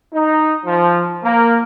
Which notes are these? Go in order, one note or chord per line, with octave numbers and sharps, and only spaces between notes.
D#4
F3
A#3